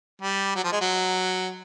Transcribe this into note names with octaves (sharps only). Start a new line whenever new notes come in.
G3
F#3
F3
G#3
F#3